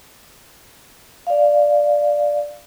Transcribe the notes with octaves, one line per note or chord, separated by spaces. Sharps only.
D5 F5